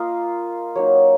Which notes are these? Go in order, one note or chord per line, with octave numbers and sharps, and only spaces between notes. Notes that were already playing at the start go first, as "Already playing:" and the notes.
Already playing: A#3 F4 D#5 F5
F#3 A#3 D#4 C#5